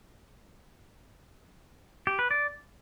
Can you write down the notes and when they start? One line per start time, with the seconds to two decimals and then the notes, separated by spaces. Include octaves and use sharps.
2.07 G4
2.19 B4
2.31 D5